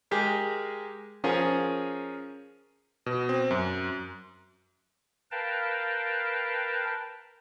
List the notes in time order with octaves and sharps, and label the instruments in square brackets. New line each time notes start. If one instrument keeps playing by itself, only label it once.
[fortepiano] G#3 G4 G#4 A#4
F3 C#4 F4 G#4 A#4
[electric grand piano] B2
C4
F#2
[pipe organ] A#4 B4 F5 G5 A5